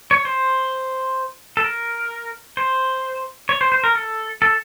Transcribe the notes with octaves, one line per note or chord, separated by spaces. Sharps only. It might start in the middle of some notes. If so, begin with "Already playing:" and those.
C#5
C5
A4
A#4
C5
C#5
C5
C5
A#4
A4
A4